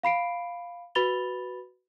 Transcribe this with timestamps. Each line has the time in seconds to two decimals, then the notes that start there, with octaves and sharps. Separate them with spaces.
0.03 F5 B5 C7 D7
0.95 F#4 B4 B5 A6 F7 G7